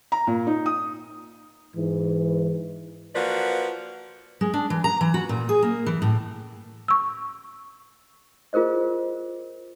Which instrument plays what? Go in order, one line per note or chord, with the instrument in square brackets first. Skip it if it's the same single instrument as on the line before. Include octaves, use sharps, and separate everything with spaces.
[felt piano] A#5
A#2
D#4
D#6
[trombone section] G#2 E3
[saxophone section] F3 A#3 F#4 B4 D5
[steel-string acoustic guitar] G#3
D4
E3
A#5
E3
F#4
A#2
G#4
A#3
E3
A2
[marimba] C#6 E6
[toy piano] F4 G#4 A#4 C5 D#5